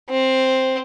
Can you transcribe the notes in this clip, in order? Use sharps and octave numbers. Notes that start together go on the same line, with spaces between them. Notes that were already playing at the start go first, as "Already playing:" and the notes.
C4